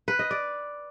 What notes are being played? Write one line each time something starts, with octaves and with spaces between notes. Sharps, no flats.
B4
D#5
D5